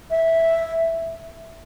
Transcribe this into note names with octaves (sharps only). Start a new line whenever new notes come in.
E5